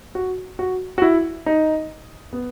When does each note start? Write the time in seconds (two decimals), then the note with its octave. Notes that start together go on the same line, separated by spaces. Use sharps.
0.15 F#4
0.59 F#4
0.98 F#4
1.02 E4
1.46 D#4
2.33 B3